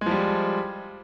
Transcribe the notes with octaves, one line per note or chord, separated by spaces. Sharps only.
F3 G3 G#3